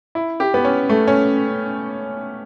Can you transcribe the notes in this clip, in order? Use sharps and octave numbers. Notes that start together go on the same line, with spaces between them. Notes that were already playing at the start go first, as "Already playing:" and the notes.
E4
G4
B3
C#4
A3
C#4